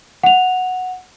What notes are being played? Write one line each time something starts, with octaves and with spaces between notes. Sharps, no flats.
F#5 F7